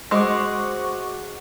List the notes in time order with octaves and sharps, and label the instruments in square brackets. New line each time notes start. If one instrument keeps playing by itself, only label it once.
[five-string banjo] G#3 [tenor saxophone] F#4 [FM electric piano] C5 C#6 D6